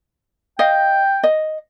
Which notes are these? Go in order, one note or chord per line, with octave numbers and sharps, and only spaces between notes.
D#5 F5 G5
D#5